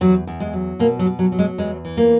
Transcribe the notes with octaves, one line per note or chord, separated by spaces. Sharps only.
E2 F#3
E2
G#3
F#3
B2 A#3
F#3
B2
F#3
F#3
G#3
E2 G#3
E3
A#3